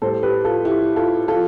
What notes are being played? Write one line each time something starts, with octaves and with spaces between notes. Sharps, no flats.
A2 G3 A4 C5
G4 B4
F4 A4
E4 G4
F4 A4
F3 F4 A4